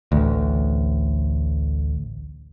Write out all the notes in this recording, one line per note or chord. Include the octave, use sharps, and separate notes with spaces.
A1 D2